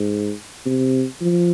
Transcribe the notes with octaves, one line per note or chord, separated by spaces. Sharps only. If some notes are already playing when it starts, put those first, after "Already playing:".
Already playing: G#2
C3
F3